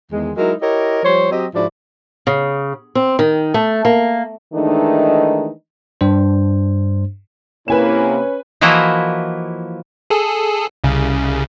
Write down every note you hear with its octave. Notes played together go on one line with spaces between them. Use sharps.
E2 D#3 G#3
F#3 G#3 D#4 E4 A#4
E4 G4 A#4 C#5 D#5
F3 G3 C5 C#5
F#3 C4 G4 D#5
G#2 F3 E4 F#4 D5
C#3
C4
D#3
A3
A#3
D#3 E3 G#3 A3 D4 D#4
G2 D4 C5
C3 A#3 C#4 E4 B4 G#5 E7
E3 F3 A#3 E4 F#4 D#5
G#4 A4
C2 C#3